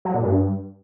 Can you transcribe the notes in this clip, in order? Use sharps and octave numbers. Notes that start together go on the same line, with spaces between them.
F#3
A#2
G2